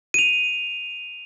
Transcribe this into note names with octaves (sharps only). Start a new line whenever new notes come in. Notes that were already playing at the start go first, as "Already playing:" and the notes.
D#7 F7